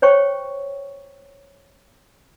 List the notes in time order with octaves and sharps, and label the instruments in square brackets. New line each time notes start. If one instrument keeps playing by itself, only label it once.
[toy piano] C5 C#5 G5 C#6